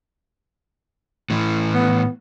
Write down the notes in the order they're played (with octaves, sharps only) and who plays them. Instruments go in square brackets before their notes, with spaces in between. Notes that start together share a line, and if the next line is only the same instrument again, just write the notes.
[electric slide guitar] A2 E3
[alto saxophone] B3